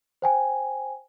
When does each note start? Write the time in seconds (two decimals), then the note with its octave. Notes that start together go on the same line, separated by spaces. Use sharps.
0.22 C5 G5 G#5